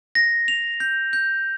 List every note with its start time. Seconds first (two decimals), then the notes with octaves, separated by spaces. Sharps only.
0.15 A#6
0.48 F7
0.80 G6
1.13 G6